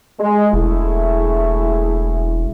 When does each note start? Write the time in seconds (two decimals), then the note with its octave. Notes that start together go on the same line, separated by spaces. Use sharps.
0.20 G#3
0.53 E1 A3 E4 G#4